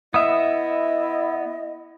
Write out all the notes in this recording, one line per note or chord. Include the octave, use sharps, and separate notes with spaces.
B3 E4 D#5 E5 D#6